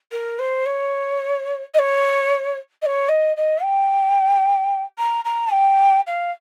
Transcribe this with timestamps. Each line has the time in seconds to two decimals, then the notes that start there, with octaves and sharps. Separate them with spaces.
0.12 A#4
0.39 C5
0.66 C#5
1.74 D#5
1.79 C#5
2.82 D#5
2.86 C#5
3.09 D#5
3.37 D#5
3.63 G5
4.98 A#5
5.25 A#5
5.52 G5
6.07 F5